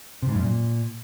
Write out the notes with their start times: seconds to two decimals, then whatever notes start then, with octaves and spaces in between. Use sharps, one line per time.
0.22 C3
0.29 G#2
0.35 F#2
0.41 A#2